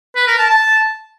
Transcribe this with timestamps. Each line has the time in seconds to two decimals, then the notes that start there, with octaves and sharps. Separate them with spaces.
0.16 B4
0.27 A#4
0.39 A5
0.50 A5